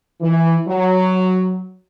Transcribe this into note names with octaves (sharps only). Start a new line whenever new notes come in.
E3
F#3